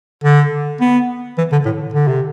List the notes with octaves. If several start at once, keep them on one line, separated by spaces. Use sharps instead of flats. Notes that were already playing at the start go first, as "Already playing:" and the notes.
D3
B3
E3
D3
A2
D3
C3